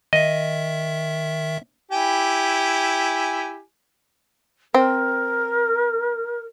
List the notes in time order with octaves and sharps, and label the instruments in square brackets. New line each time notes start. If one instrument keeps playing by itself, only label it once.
[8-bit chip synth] D#3 E5 [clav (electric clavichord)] D#5
[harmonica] E4 G4 G#5
[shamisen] C4 [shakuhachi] A#4